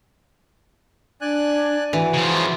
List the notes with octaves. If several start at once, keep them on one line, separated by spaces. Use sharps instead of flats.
D4 D5 G#5 F#6
E3 F#4
C#3 F3 E4